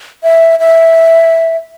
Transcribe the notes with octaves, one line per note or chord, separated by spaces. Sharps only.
E5
E5